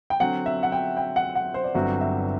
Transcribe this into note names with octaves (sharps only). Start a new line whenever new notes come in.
G5
D3 F#3 C4 F#5
E5
F#5
G5
G5
F#5
F#5
C5
D5
G1 G2 F#3 C4 F#4 E5
E5